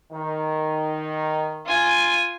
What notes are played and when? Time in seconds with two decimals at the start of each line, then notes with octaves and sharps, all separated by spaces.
0.12 D#3
1.66 F4 G#5